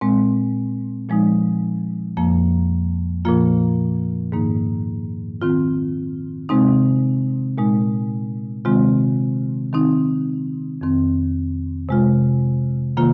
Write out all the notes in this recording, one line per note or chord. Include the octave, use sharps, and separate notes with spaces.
A#2 G#3 C4
A#2 F3 G#3 D#4
F2 F3 A#3
A#2 F3 A#3 F4
G#2 D#3 A#3 D#4
D#3 C4 F4
C3 G#3 C4 D#4
A#2 G#3 D#4
C3 D#3 G#3 C4 F4
D#3 C4 D#4
F2 D#3 C4
C3 G#3 F4
C3 D#3 A#3 F4